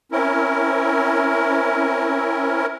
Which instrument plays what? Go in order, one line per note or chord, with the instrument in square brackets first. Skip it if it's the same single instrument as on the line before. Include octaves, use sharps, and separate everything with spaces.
[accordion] C4 C#4 E4 A#4